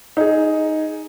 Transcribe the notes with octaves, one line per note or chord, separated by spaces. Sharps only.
D#4 G#4